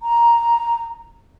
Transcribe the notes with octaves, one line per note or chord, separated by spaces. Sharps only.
A#5